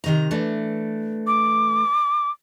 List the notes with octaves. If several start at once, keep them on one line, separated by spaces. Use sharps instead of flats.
C3 D#3 A#5
E3 A3 D4
D6